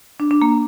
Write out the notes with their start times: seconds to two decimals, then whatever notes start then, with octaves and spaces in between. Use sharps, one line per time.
0.20 D4
0.31 D4
0.42 A#3